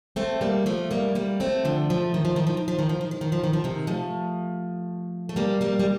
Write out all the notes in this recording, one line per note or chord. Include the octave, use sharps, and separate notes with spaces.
A3 C4
G3 A#3
F3 A3
G3 A#3
G3 A#3
A3 C4
D3 F3
F3 A3
D#3
F3
D#3
F3
D#3
F3
D#3
F3
D#3
F3
D#3
F3
D#3
F3
C3 D#3
F3 A3
A3
G3 A#3
G3 A#3
G3